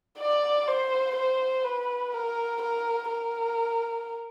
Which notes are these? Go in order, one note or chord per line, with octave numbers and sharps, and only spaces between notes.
D5
C5
C5
B4
A#4
A#4
A#4